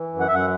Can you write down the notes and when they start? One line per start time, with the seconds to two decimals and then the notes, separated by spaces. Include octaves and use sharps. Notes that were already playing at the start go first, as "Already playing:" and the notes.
Already playing: E3
0.12 F#2
0.20 F#5
0.28 F#2 E5
0.35 F#5